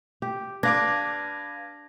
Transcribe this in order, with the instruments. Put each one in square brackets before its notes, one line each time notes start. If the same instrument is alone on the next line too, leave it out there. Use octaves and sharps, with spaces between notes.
[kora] G4
[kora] D4 [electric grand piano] B4 F5 D6 [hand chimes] G#6 A#6